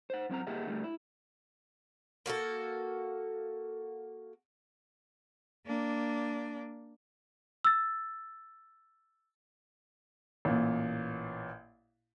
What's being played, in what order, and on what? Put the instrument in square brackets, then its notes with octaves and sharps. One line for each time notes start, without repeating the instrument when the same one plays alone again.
[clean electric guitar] C5 F#5
F#2 C4 F#5 A#5
A#3 G4 G#4 D#5 E5 F#5
D3 G3 A3
E4
[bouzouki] A#3 F#4 G#4 A4
[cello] A#3 D4
[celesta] E6 A6
[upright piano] A1 A#2